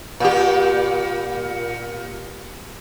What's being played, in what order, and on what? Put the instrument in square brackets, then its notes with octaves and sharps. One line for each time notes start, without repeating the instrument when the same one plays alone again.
[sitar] A#2 G4